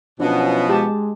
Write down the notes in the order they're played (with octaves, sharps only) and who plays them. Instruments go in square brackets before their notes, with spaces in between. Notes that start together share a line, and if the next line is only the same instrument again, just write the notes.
[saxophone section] B2 B3 [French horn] F3 [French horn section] F#3 C#4 E4 [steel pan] D4
[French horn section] G#3 [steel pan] G4 A5